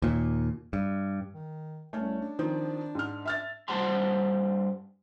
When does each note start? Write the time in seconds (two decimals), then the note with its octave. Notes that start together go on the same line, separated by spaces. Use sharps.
0.02 D#2 A#2
0.73 G2
1.33 D#3
1.93 C2 A3 C#4
2.21 D4
2.39 D#3 F3 C4
2.95 G#2 F6
3.25 E5 F6 A6
3.68 G2 G4 C5 F#5 A5 C6